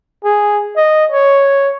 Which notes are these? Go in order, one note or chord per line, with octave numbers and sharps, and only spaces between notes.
G#4
D#5
C#5